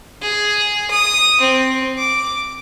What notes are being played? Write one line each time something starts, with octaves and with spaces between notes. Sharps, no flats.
G#4
D#6
C4
D6